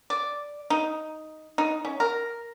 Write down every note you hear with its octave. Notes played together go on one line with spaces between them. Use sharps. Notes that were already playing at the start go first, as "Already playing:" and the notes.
D5
D#4
D#4
C#4
A#4